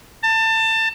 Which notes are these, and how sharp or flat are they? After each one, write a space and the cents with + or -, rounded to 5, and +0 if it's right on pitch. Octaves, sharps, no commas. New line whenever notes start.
A5 +25